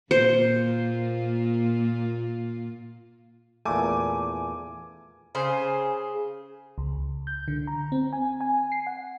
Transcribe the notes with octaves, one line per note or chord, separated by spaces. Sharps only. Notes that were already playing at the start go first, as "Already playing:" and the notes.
A#2 A#3 F4 C5
E2 A#2 A3 G#5 D6
C#3 G#4 C5
C#2
G6
D3
A#5
C4
G#5
G#5
C7
F#5